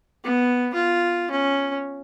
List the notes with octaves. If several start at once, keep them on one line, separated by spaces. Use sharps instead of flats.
B3
F4
C#4